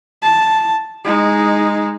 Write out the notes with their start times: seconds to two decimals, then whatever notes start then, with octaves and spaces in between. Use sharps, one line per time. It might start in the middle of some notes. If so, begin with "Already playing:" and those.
0.22 A5
1.05 G#3 D#4